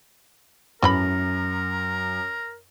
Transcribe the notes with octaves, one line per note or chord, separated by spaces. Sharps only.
F#2 E3 A3 A#4 B5